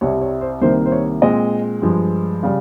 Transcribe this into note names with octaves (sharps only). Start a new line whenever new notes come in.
C2 C3 G3 C#5
C#5
C5
C2 C3 D#3 A#3 C5
C5
C#5
A#2 G#3 C4 D#5
G2 F3 G#3
C#3 G3 F5